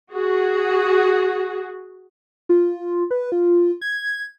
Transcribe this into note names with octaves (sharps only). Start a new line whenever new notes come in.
F#4 G#4
F4
B4
F4
G#6